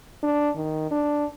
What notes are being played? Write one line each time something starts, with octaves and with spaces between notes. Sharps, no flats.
D4
D#3
D4